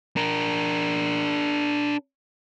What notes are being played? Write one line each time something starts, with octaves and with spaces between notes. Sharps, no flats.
D4 A#4